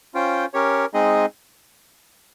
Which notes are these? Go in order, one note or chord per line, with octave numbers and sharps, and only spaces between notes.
C#4 F4 C5 G5
C#4 G4 A#4 C#5
G#3 C4 D#4 G#4 D#5